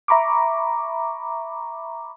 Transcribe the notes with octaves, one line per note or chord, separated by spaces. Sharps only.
E5 A#5 B5 C#6 D6